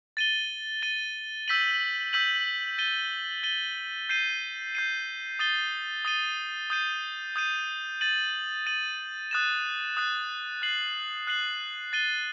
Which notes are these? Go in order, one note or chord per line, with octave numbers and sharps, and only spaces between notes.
A6 D#7 G7
A6 D#7 G7
E6 G6 B6 D#7 F#7
E6 G6 B6 D#7 F#7
A6 D#7 G7
A6 D#7 G7
G6 C7 D#7
G6 C7 D#7
D#6 A6 D#7 G7
D#6 A6 D#7 G7
D#6 G6 D#7
D#6 G6 D#7
A6 D#7 F#7
A6 D#7 F#7
D#6 F#6 A6 E7
D#6 F#6 A6 E7
F#6 C7 F#7
F#6 C7 F#7
A6 D#7 G7